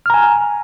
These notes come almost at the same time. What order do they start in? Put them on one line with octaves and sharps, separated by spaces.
F6 A#5 G#5